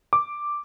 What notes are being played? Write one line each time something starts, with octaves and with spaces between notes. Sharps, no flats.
D6